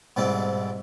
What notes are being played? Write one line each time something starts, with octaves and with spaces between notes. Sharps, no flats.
G#2 B2 G3 C4 E4 A4